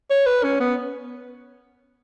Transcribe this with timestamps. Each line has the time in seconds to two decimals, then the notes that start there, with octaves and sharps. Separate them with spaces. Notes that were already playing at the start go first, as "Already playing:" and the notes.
0.10 C#5
0.26 B4
0.44 C#4
0.60 B3